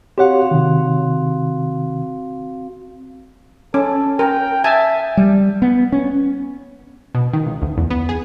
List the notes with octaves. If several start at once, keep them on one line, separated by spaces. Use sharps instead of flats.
C4 F#4 G4 C#5 F5 F#5
C3 D#3
C#4 A4
A#4 G5
E5 G#5 A5
G3
B3
C#4
B2
D#3
C#2
D2
E2
B3
G#4